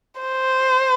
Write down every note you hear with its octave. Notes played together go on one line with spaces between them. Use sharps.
C5